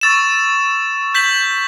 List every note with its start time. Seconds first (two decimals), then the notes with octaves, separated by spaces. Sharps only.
0.01 C#6 E6 A6 E7
1.15 G6 B6 F#7